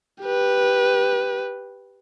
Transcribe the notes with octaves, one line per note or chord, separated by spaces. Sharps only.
G4 B4